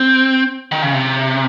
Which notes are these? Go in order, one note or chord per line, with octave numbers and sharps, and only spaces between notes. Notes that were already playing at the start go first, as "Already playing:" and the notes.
Already playing: C4
D#3
C#3
C3